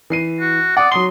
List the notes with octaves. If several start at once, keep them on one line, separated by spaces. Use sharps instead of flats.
E3 C7 D#7
F#4
D5 F#5 D#6
F#3 C6 D#6 G7